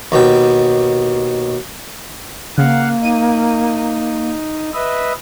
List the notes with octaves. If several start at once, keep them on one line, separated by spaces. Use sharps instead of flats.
D#2 B2 G5
C#3 A#3 F5 F#5
D#4 D#7
B4 D#5 E5